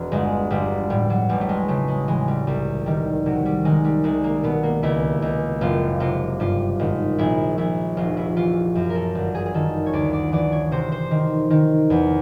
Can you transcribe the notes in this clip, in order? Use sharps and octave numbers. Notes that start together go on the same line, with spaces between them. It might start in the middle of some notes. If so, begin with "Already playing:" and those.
Already playing: E1
G1 G#3
G1 G3
A2 G3
F#3
A1 G3
A3
G#3
C#3 A3
G#3
E3 G#3
G3
C2 G3
D#3 G3
C3 F#3
G3
D#3 G#3
G3
C2 G#3
A#3
B2 B3
A#3
C#2 E4
C#2
F#1 F4
C3 F4
G2 F4
G#1
A#1 E4
A#1 E4
F1 F4
E4
E3 F4
F#2
A#4
A4
G1
G#4
G#4
D#3 A4
C#5
D2 D5
D5
E3 D5
C#5
C3 C5
C5
D#3
D#3
E2